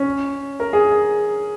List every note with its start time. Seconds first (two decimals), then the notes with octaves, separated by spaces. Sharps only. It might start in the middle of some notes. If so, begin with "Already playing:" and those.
Already playing: C#4
0.60 A#4
0.73 G#4